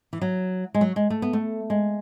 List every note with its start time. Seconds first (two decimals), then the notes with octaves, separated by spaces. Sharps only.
0.13 E3
0.21 F#3
0.74 G#3
0.81 F#3
0.96 G#3
1.10 A3
1.22 B3
1.33 A3
1.70 G#3